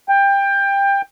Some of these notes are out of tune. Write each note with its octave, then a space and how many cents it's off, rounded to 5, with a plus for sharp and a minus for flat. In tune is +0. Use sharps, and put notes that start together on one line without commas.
G5 +20